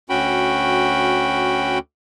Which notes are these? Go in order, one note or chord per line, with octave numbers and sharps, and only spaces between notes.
D2 C#4 F#4 G5 B5